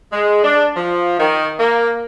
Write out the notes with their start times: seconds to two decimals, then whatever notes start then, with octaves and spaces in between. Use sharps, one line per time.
0.12 G#3
0.44 D4
0.76 F3
1.19 D#3
1.59 A#3